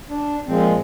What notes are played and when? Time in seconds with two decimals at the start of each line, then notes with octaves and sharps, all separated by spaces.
0.09 D4
0.47 A#2 F3 G#3 C4